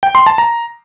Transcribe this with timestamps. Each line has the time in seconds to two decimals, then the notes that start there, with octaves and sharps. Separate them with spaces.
0.03 G5
0.15 C6
0.26 A5
0.38 A#5